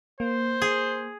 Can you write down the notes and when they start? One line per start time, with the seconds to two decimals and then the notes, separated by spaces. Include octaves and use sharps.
0.20 A#3 C5
0.62 G#4